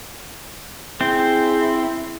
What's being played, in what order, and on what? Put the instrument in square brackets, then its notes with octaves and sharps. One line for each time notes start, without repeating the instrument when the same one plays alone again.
[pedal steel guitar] C4 [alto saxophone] E4 [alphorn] G#4